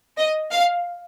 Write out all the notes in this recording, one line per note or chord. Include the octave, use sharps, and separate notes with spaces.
D#5
F5